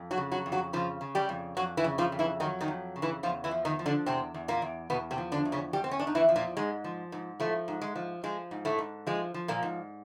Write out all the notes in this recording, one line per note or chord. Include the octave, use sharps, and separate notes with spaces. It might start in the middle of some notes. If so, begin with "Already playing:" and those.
Already playing: F2
F#3 F#4
C#3
F#3 F#4
F2
F#3 F#4
C#3 F3 F4
C#3
G3 G4
F2
F2 F#3 F#4
E3 E4
C#3
F3 F4
F2
E3 E4
D#3 F#3 D#4
D#3 D#4
F2
C#3
E3 E4
E2 F3 F4
E3 E4
F3
D#3 D#4
F3
D3 D4
E2 C3 C4
E2
A#2 A#3
E2
E2 B2 B3
C3 C4
F3
D3 D4
E2
C#3 C#4
E2 G3 G4
C4
C#4
E2 D4
D#4
E3 E4
F3
A#2 A#3
G#2 G#3
F3
G#2
A2 F3 A3
G#2
G#3
F3
F3 G#3
G#2
A2 A3
G#2
F3 G#3
F3
A#2 A#3
G#2